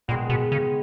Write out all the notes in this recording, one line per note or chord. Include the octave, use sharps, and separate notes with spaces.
A#2 D#3 G#3 B3
B2
C#3